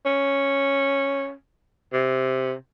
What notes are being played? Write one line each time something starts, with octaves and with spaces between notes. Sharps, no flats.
C#4
C3